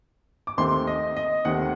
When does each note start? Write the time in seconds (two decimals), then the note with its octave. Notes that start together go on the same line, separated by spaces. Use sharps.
0.47 D6
0.58 D#2 D#3 A3 C4 C6
0.87 D#5
1.17 D#5
1.45 D#2 D#3 A3 C4 F#5